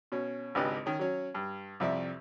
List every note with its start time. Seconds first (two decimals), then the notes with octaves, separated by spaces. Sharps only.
0.12 B2 C#4
0.55 G#1 C#2 D4 G4 B4 D#5
0.86 D#3 C#4
0.99 F#3 C#4
1.35 G2
1.80 C2 F2 D5 E5